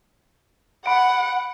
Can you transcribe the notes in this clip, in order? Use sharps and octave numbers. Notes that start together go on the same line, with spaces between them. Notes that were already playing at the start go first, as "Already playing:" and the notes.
F#5 B5 D7